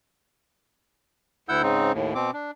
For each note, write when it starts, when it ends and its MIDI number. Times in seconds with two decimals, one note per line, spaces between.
1.49 1.62 38
1.49 1.62 64
1.49 1.62 78
1.49 1.62 88
1.49 1.62 91
1.62 1.92 44
1.62 1.92 49
1.62 1.92 60
1.62 1.92 63
1.93 2.14 39
1.93 2.14 45
2.15 2.31 47
2.15 2.31 60
2.15 2.31 86
2.33 2.51 62